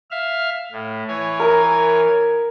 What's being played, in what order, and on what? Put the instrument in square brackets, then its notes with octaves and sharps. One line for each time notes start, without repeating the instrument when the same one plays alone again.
[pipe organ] E5 F5 F6
A2
E3 C#5 G#5
[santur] A#4 D#6